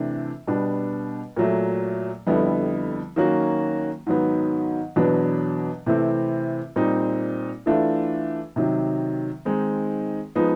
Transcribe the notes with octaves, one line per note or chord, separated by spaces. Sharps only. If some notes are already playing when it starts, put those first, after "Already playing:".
Already playing: C3 E3 A3 D4
B2 G3 B3 D4
A#2 F#3 A3
F2 D3 G3 B3 E4
D#3 F#3 A#3 C#4 F#4
G#2 D#3 F#3 B3
E2 B2 F#3 B3 D4
C3 E3 A3 C4 E4
A#2 G3 C4 D#4
E3 A3 D4 F4
C3 D#3 F#3
D#3 G#3 C4 D#4
F3 G#3 B3 D#4